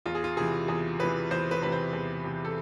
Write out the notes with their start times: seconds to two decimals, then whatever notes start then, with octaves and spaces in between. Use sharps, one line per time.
0.06 E2 F4
0.15 G#4
0.24 F4
0.37 C3 E3 G#4
0.68 E2 G#4
0.99 C3 E3 B4
1.31 E2 C5
1.51 B4
1.62 C3 E3 B4
1.72 C5
1.93 E2
2.24 C3 E3
2.45 A4